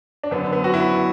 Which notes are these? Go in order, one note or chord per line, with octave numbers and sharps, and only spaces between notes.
D4
F#2 D3 B3
B3
F#4
E4